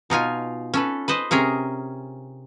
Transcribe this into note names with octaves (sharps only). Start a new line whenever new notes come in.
B2 D#4 F4 G#5
C#4 A4 B4
B4 C5 D#5
C3 C#4 G#4 A#4